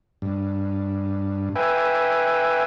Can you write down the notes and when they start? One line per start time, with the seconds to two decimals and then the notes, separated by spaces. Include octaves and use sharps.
0.22 G2
1.56 B4 E5 G5 G#5